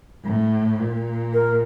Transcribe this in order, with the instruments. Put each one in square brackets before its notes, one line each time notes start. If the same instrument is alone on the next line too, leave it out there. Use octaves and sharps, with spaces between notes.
[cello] A2
A#2
[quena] A#4